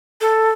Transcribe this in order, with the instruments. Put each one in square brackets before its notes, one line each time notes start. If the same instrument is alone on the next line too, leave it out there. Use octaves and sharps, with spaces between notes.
[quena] A4